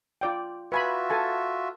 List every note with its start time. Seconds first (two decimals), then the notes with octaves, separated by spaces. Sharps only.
0.21 F4 D5 G5
0.72 F4 F#4 B4 E5 G#5 B5
1.10 A4 G#5 A5